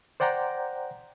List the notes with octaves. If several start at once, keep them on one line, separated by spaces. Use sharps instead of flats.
C5 D5 F#5 G5 A#5